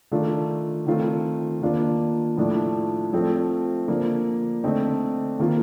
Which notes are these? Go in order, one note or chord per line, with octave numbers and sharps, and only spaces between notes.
D#3 A3 D4 F4
D#3 A3 C4 F4
D#3 A#3 D4 F4
A2 F3 A3 D4
F3 A3 C4
D3 F3 A#3
D3 A3 C4 D#4
D#3 A#3 F4